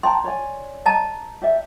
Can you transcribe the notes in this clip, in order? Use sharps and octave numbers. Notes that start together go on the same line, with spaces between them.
G5 A5 A#5 C6
C#5 D5 G#5
D#5 A5 A#5
G4 D5 E5